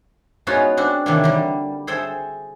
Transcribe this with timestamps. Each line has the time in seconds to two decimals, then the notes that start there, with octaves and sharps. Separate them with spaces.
0.47 G#3 B3 C#4 D#4 F4 F#4
0.77 C4 D4 F#4
1.06 C3 D#3 E3 F#3 A#3 D4
1.24 D3 G3
1.87 G#4 A4 C5 E5 G5